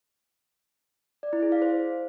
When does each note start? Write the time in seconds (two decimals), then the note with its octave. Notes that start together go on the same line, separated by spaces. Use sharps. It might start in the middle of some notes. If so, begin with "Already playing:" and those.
1.23 D5
1.33 E4
1.42 G#4
1.52 F5
1.62 C5